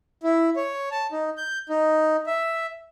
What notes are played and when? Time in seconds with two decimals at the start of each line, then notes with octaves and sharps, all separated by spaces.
0.23 E4
0.56 C#5
0.91 A5
1.12 D#4
1.38 G6
1.69 D#4
2.27 E5